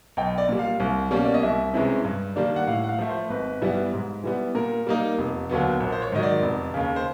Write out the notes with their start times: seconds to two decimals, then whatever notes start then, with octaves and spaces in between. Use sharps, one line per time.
0.17 B1 G5
0.38 D5
0.49 A#2 G3
0.59 F5
0.80 C2
1.11 B2 G3 A#3 C#4
1.25 D5
1.34 D#5
1.43 C2 E5
1.74 C3 E3 G#3 C#4
2.05 G2
2.36 D#3 G3 A#3 D4
2.56 F#5
2.67 A2 F5
2.84 F#5
2.89 F5
2.99 F3 A3
3.09 C5
3.30 G#1 B4
3.61 G2 E3 G3 B3
3.93 G#2
4.24 E3 G3 B3
4.55 A#2 A#4
4.87 G3 A#3 D#4
5.18 F1
5.49 D#2 D3 F#3 B3
5.80 A#1
5.92 C5
6.02 C#5
6.12 G#2 D#3 F#3 D#5
6.23 D5
6.43 F1
6.74 D#2 C#3
6.96 C5